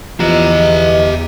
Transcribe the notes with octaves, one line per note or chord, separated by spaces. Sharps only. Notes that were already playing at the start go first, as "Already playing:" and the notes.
E2 E3 F3 G4 D#5 A#5